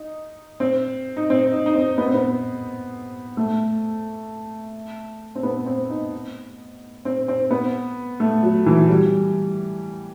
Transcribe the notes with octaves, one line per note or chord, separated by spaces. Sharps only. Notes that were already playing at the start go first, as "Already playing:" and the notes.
Already playing: D#4
C4
D#4
C4
D#4
D#4
C4
B3
C4
B3
A3
C4
B3
C4
D#4
C4
C4
B3
A3
F#3
E3
G3